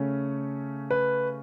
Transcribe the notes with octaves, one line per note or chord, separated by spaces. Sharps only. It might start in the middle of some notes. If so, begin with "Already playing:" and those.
Already playing: C#3 A3 C#4
B4